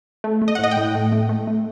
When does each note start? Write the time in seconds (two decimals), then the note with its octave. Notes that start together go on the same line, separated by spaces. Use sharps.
0.24 A3
0.42 A3
0.48 D#5
0.55 F#5
0.59 A2 D#5
0.71 G5
0.77 A2
0.95 A3
1.12 A3
1.29 A3
1.47 A3